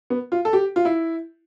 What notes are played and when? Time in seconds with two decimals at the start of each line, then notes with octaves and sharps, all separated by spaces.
0.10 B3
0.32 F4
0.45 A4
0.53 G4
0.76 F4
0.85 E4